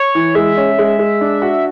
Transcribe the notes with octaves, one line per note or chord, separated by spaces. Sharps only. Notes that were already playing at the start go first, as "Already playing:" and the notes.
Already playing: C#5
E3
G#3 E5
C#4
G#3
G#3
D4
F#4